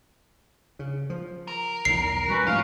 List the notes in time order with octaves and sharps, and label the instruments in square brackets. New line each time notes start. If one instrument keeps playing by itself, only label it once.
[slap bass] C#3
F3
[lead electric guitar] A#4
[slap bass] B1 E2 [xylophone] C7
[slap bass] G3 [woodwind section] C#4 F#4 B4
[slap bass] G#2 F3 A3 [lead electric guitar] C#4 [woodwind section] F5